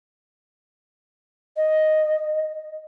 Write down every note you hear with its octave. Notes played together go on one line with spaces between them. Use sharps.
D#5